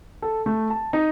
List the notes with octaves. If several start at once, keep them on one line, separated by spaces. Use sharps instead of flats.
A4
A3
A5
D#4